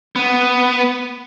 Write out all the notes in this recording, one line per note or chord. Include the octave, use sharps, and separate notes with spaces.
B3